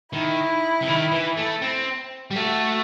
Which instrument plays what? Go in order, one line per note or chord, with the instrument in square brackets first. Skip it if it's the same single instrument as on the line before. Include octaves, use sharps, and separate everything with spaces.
[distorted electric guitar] D#3 [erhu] E4
[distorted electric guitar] C3
D#3
E3
A3
C4
G3
[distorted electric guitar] A3 [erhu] F#4